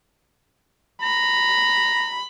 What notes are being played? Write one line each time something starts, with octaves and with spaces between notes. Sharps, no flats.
A#5 B5